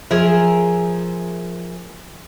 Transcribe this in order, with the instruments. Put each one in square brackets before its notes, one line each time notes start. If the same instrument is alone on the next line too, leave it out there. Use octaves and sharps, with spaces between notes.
[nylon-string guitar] F3 [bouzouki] G#4 A#4 E5